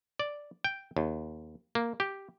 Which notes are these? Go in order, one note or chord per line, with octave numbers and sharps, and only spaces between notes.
D5
G5
D#2
A#3
G4